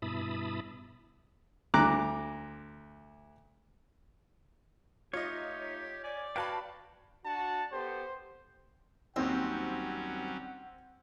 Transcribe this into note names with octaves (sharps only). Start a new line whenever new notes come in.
G2 B2 E4 A5 B5 D#6
D2 A#5 D6 F#6
A3 D#4 F4 G4 C#5 D#5
D5 G#5
F#4 B4 C#5 F5 G5 A5 B5
D4 F#4 A5
B3 G4 A4 C5
D#2 F#3 G3 C4 C#4 F#5